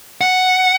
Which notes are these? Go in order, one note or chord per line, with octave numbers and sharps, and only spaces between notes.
F#5